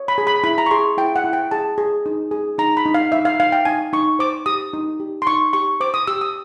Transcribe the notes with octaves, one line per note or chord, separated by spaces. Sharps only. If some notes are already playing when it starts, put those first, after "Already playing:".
Already playing: C#5
B5
G#4
B5
E4 B5
A#5
C#6
G#4 C6
E4 G5
F#5
E4
G5
G#4 A5
G#4
D#4
G#4
D#4 A#5
B5
D#4
F5
D#4 E5
F5
D#4 F5
G5
D#4 G#5
D#4 C#6
C5 D6
G4 D#6
D#4
G4
C6
D#4 C#6
G4 C#6
C5 D6
D#6
G4 E6
D#6